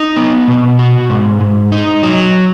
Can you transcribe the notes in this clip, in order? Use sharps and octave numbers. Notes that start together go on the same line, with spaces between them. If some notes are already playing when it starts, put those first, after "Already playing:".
Already playing: D#4
B3
B2
F#4
G#2
G#2
D#4
F#3